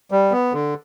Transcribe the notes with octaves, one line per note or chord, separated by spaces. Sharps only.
G3
B3
D3